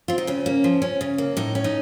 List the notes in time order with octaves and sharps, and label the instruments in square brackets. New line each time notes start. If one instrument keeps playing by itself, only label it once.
[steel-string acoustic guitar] C4 F4
D#4
C#3 C#4
A#3
F3
C#4
C#3
A#3
A2 D#4
C#4
D#4